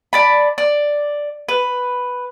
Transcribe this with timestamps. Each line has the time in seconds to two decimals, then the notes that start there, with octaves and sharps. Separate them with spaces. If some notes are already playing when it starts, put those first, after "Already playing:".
0.13 D5 A5 B5
0.58 D5
1.49 B4